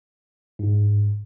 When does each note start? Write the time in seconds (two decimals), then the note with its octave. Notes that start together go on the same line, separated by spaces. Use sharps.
0.59 G#2